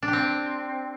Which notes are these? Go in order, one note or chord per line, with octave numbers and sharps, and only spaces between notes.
D4
G4
C4